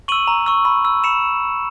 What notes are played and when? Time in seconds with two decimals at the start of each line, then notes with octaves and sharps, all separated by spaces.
0.08 C#6 E6 D#7 F#7
0.27 A#5
0.46 C#6 E6
0.65 B5
0.85 E6
1.04 B5 C#7 E7